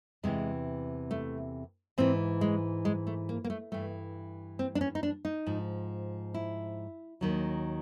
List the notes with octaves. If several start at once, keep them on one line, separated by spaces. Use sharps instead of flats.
E2 C3 E3 G#3
A3
G#2 E3 C4
G#3
G#3
A3
A#3
A#3
A3
G2 E3 A3
C4
D4
C#4
D#4
D4
D#4
G#2 F3
E4
D#2 D#3 F#3